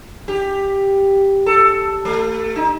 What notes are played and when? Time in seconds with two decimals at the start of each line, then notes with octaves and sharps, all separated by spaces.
0.28 G4
1.46 A4
2.05 A3
2.56 D#4